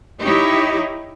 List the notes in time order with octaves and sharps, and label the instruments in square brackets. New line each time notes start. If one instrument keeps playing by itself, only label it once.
[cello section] D#4 E4 G4 C#5